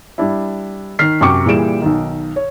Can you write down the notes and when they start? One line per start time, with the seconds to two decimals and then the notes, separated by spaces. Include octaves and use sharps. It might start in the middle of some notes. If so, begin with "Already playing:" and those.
0.18 G3 D4 E4
0.99 D#3 F6 B6 C7
1.21 F#2 C3 G5 C#6 D6 C#7
1.46 A#2 E3 G3 G#4 D7 E7
1.82 B1 D#3
2.36 C#5